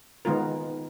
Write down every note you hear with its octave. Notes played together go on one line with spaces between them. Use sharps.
D#3 G#3 B3 F4 A#4